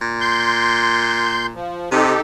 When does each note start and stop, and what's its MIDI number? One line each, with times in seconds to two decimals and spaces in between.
0.02 1.58 46
0.20 1.46 84
0.20 1.46 91
1.55 1.90 53
1.92 2.13 48
1.92 2.21 63
1.92 2.21 67
1.92 2.21 69